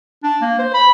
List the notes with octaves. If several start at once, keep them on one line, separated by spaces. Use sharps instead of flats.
D4
A#3
C5
B5